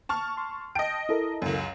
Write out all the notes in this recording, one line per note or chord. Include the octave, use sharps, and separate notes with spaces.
A5 C#6 F6
C6
D#5 G5 A5 D7
E4 A4 A#4
C#2 F#2